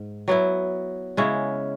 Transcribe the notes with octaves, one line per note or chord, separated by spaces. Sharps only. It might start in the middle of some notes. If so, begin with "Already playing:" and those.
Already playing: G#2
F#3 B3 E4
C#3 G#3 C#4 E4